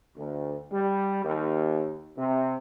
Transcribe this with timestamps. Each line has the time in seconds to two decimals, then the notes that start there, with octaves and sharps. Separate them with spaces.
0.17 D2
0.72 G3
1.24 D#2
2.16 C3